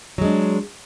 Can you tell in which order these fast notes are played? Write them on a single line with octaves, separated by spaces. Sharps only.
F#3 G#3 D4